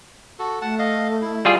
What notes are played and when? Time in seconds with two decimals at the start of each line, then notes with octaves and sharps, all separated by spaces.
0.39 F#4 A4
0.62 A3 F#5 A5
0.79 D#5 F5
1.21 E4
1.45 G3 F4 G#4